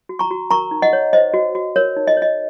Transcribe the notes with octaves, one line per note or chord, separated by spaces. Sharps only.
F#4
A#5 C#6
F#4
A#4 A#5 C#6
D#4
D#5 F#5
C#5
C5 D#5
F#4
F#4
A#4 C#5
D#4
D#5
C#5
D#5